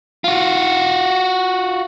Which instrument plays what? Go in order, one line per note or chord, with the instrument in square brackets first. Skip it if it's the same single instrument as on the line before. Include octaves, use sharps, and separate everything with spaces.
[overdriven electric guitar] F4 F#4